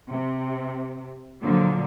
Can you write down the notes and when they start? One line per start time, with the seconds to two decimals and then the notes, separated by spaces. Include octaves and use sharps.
0.12 C3
1.42 A#2 D3 F3 F#3